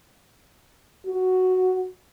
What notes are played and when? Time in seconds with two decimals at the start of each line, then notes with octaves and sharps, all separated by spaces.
1.07 F#4